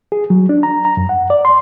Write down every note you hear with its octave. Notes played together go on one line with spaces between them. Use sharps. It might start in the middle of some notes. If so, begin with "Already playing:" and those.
G#4
F#3
D4
A#5
A#5
F#2
F#5
D5
C6